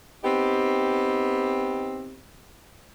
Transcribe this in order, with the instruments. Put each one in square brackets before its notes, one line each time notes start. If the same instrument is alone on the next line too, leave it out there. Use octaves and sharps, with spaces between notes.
[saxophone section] B3 C4 D#4 G4